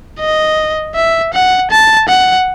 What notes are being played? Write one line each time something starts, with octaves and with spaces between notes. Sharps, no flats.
D#5
E5
F#5
A5
F#5